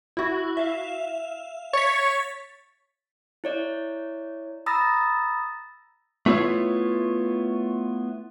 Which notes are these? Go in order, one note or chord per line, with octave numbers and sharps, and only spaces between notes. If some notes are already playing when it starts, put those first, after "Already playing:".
E4 F#4
E5 F5
C#5 A6 B6
E4 C#5 D5
A#5 B5 D#6 E6 A6 A#6
A3 B3 E4 F4 C#5